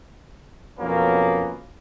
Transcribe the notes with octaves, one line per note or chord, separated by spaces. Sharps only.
F2 B2 F#3 A#3 B3 C#4